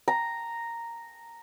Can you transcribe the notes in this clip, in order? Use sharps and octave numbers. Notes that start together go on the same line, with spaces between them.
A#5